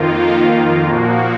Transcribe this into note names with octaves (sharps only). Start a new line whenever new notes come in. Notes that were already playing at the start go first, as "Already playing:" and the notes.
Already playing: F2 D#3 A#3 F4
A#2 F3 A#3 F#4